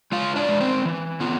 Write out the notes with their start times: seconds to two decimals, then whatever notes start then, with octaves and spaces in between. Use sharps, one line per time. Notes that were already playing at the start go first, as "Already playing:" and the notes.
0.12 G#3 F4 F5
0.36 D4 D5
0.49 G#3
0.61 C4 C5
0.85 E3
1.20 B3 F4